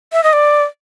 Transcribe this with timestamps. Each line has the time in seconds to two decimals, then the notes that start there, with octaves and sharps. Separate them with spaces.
0.13 E5
0.24 D#5
0.33 D5